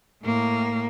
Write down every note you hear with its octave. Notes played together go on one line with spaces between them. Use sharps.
A2 A#3